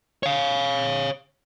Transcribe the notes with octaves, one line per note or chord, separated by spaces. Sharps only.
C#5 F5